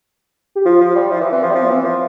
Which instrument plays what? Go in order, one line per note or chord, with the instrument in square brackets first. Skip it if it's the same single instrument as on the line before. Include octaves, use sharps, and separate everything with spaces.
[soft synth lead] G4
[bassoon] F3 [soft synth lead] F4
[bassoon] F3
G3
[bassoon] F3 [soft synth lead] E4
[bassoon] E3
[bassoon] E3 [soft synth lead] C4
[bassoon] F3
G3
[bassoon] F3 [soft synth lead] C4
[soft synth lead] B3
[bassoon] E3 [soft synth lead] C4
[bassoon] F3